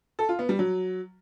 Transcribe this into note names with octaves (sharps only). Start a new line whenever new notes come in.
A4
F4
B3
G3
F#3